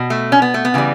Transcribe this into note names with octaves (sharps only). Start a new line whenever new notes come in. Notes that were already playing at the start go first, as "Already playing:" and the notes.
Already playing: B2
A3
C#4
B3
A3
B3
C#3 E3 G3